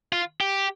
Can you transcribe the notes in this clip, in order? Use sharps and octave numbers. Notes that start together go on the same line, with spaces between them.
F4
G4